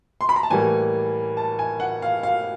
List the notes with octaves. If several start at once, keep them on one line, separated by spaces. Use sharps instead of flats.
C6
B5
A#5
A5
A2 E3 G3 A#3 G#5
A5
G#5
F#5
F5
F5